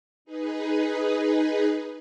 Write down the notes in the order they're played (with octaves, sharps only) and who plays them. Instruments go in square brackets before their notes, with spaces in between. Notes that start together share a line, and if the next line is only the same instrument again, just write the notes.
[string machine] D#4 G#4 B4